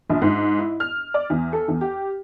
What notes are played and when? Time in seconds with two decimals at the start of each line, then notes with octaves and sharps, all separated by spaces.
0.10 A#1
0.22 G#2
0.59 E4
0.80 F6
1.14 D5
1.30 E2
1.53 A4
1.68 E2
1.81 G4